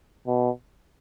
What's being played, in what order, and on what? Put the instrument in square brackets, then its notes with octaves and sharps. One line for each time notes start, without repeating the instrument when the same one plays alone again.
[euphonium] B2